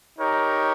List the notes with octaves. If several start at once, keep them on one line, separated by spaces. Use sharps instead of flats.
D#4 G4 A#4 C#5